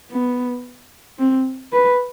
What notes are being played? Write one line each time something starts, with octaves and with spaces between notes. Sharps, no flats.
B3
C4
B4